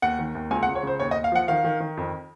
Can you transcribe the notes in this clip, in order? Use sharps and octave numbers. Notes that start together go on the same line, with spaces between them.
D#2 F#5
D#3
D#2
C#2 G#5
F#5
C#2
C#5
C#3 C5
D#2 C#5
D#5
D#2
F5
F3 F#5
D#3 F5
D#3
D#3
F2